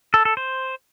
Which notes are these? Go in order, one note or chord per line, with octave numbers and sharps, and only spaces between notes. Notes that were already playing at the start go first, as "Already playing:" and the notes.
A4
A4
C5